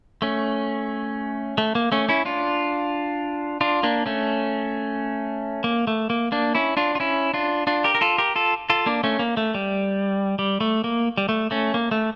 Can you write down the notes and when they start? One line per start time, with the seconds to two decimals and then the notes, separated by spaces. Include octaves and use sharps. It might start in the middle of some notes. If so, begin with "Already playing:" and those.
0.22 A3 C#4
1.58 A3
1.75 A#3
1.92 A3 C#4
2.09 C#4 E4
2.25 D4 F4
3.61 D4 F4
3.83 A#3 D4
4.06 A3 C#4
5.64 A#3
5.87 A3
6.10 A#3
6.32 A#3 D4
6.55 C#4 E4
6.77 D4 F4
6.95 F4
7.00 C#4 E4
7.34 D4 F4
7.67 D4 F4
7.84 G4 A#4
7.95 A#4
8.01 F4 A4
8.18 G4 A#4
8.36 F4 A4
8.70 F4 A4
8.86 A#3 D4
9.04 A3 C#4
9.19 A#3
9.37 A3
9.54 G3
10.39 G3
10.61 A3
10.84 A#3
11.18 G3
11.29 A3
11.51 A3 C#4
11.74 A#3
11.91 A3